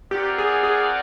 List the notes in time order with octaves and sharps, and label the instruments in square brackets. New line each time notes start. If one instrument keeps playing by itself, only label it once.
[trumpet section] C4 F4 A#4 D5 F#5 [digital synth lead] G4
[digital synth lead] G#4
G#4